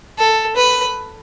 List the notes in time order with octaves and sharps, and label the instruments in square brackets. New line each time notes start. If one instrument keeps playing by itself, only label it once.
[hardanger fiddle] A4
B4